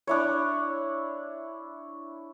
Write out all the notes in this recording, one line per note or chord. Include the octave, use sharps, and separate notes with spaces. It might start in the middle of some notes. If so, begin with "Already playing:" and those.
D4 E4 C#5